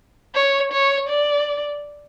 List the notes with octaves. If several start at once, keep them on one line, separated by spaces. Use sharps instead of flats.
C#5
C#5
D5